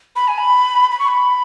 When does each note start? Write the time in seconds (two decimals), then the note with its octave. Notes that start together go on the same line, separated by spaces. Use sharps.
0.16 B5
0.28 G#5
0.40 B5
0.91 B5
0.99 C#6
1.08 B5